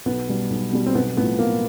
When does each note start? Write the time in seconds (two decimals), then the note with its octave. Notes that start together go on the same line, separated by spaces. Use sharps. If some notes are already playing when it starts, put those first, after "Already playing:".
0.05 B1 B3
0.29 B2 G3
0.50 B1
0.72 B2 G3
0.86 C4
0.95 B1 B3
1.17 A2 B3
1.21 F3
1.39 B1 A#3